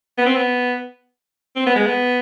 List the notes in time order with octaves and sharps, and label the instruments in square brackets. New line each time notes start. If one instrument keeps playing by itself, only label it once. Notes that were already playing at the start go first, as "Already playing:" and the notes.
[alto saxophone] B3
C4
B3
C4
B3
G#3
B3